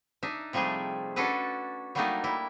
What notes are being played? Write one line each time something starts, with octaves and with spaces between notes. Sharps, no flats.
D4 D#4 E5
C3 F3 G3 A3 G#4
C#4 D4 F#4 A4 B4
F#3 G3 A3 A#3 D4 D#4
G3 E4